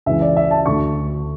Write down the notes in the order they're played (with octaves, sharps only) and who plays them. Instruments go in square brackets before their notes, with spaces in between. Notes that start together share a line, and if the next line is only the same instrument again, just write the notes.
[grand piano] C#2 C#3 E3 E5
D5
E5
A5
D2 D3 C#6